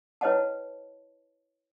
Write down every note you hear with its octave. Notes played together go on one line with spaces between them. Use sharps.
E4 B4 C#5 D#5 F#5 A5